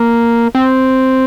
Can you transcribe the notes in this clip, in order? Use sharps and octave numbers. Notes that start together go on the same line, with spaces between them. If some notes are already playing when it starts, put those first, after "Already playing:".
Already playing: A#3
C4